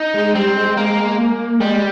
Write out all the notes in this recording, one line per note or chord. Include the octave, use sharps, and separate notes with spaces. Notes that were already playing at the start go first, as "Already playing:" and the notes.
Already playing: D#4
G#3
G3 C4
G#3
G#3 A#3
A#3
G3 G#3